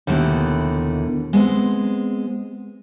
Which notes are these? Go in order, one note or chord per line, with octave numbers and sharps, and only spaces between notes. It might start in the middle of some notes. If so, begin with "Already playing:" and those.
D#2 B2 D3 E3 A3
G#3 B3 C4